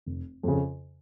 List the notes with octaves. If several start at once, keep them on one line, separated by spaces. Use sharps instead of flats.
F1
F2 C#3